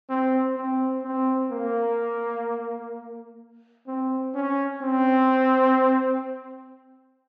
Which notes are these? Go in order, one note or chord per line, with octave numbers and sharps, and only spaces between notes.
C4
C4
C4
A#3
C4
C#4
C4